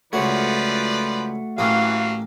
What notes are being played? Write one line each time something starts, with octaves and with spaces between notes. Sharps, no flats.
C#2 F3 A3 F#4 B4 C#5 D5
A1 E3 F#3 A#3 A#4 F5